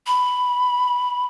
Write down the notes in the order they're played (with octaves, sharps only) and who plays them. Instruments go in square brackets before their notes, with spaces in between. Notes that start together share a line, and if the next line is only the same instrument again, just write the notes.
[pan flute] B5